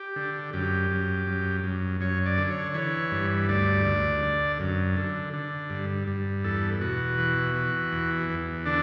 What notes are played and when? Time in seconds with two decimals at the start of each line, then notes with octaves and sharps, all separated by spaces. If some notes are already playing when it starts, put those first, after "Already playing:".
Already playing: G4
0.16 D3
0.53 F#2 G4
0.91 F#2
1.27 F#2
1.64 F#2
2.00 F#2 C#5
2.26 D5
2.38 D3
2.50 C#5
2.74 E3 C#5
3.11 G2
3.49 D2 D5
3.85 D2
4.22 D3
4.60 F#2
4.97 D3
5.33 D3
5.70 G2
6.07 G2
6.44 E2 A4
6.81 B2 F#4
7.18 E3
7.55 E3
7.92 E2
8.29 E2
8.66 D3 D4